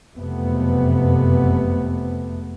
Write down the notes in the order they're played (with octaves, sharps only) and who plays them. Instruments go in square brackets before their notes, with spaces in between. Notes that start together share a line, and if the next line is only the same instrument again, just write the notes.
[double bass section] F#1 F2 C3 A3 B3